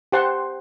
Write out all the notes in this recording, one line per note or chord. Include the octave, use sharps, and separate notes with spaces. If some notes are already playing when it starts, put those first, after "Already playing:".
G4 C5 F#5 A5 C6